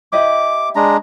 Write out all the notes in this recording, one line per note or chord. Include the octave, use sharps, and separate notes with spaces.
E4 G4 D#5 D6
G#3 D4 A#5